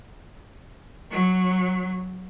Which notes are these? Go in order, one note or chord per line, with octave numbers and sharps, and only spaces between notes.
F#3